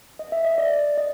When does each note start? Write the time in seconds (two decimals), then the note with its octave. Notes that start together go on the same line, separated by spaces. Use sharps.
0.19 D#5
0.32 E5
0.45 D#5
0.58 D5
0.97 D#5